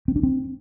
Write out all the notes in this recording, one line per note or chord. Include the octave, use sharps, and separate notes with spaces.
C4
D4
C4